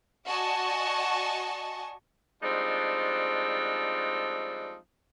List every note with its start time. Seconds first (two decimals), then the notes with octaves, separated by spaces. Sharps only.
0.27 F#4 D5 D#5 G#5 A5 C#6
2.42 F3 G3 G#3 C4 D4 D#4